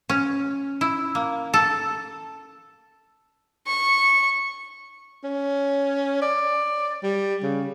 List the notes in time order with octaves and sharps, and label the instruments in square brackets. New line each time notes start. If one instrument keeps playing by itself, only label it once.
[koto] C#4
E4
A#3
A4
[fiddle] C#6
[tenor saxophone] C#4
D5
G3
C#3